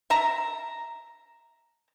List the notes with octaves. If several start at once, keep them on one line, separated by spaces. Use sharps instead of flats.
E5 A5 A#5